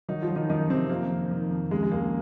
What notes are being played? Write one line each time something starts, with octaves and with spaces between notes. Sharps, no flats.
D#3 F#3 D#4
F3 F4
F#3
D#3 D#4
F#2 D#3 D#4
C3 D#3 C4
F2 A#3
F2
D#3
F2
C#2 G#3
G#3
C#2 A#3